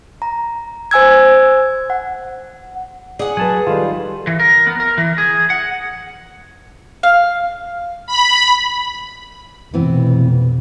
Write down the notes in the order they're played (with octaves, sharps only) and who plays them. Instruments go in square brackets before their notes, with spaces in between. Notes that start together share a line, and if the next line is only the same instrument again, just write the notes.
[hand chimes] A#5
C5 G#5 E6 G#6
F#5
[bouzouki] G#4 F#5 [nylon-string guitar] D5
[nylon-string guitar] F#3 B4 [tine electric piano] G#5 A5
[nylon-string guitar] D#3 A4 [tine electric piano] G3 F4
[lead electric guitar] E3
A#4
B3
A#4
E3
G#4
F#5
[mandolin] F5
[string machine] B5
[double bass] F1 B2 [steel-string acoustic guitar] E3 B3 C4